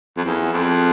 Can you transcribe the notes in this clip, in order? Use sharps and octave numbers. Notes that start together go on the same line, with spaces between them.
F2
E2
F2